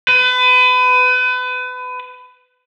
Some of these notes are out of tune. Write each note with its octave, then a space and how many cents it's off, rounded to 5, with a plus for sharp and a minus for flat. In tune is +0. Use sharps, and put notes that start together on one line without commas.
B4 +30